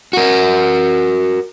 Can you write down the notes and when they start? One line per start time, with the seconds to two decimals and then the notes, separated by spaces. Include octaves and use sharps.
0.13 F#4 A#4